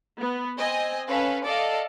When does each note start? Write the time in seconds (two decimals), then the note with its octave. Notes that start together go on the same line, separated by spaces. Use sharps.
0.17 B3
0.57 C4 D#5 G#5
1.08 C#4 A4 B4 F5
1.44 A4 D5 D#5 F5